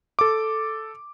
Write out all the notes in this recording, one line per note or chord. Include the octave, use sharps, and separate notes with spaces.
A4 D6